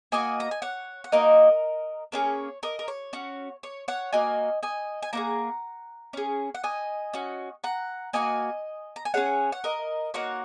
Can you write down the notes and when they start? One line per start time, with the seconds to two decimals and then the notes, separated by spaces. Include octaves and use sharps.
0.12 A#3 F#4 D#5 G#5
0.40 A#5
0.51 G#5
0.62 C#5 F#5
1.04 F#5
1.12 A#3 D#4 F#4 A#4 D#5
2.12 A#3 C#4 G#4 C#5
2.63 A#4 D#5
2.79 A#4
2.88 C#5
3.13 C#4 F#4
3.63 C#5
3.88 C#5 F#5
4.13 A#3 F#4 D#5 G#5
4.63 D#5 G#5
5.03 G#5
5.13 A#3 D#4 G#4 F#5 A#5
6.13 C#4 G#4
6.55 F#5
6.64 D#5 G#5
7.13 C#4 F#4
7.64 F#5 A#5
8.13 A#3 F#4 D#5 G#5
8.96 A#5
9.05 G#5
9.14 C#4 G#4 C#5 F#5
9.52 F#5
9.64 A#4 D#5
10.14 A#3 D#4 F#4 C#5 F#5